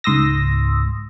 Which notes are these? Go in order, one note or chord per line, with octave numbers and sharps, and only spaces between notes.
C#2 G#2 C6 D#6 E6 A#6